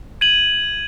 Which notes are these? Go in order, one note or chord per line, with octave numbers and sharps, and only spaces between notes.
G#6 D#7 F#7